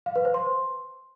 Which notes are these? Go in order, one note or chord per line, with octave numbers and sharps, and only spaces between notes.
F5
B4
C5
C6